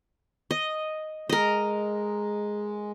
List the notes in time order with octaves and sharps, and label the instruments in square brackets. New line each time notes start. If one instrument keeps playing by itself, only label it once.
[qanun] D#5
[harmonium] G#3 [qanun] A#4 D#5